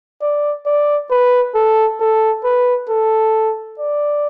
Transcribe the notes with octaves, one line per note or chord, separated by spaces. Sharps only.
D5
D5
B4
A4
A4
B4
A4
D5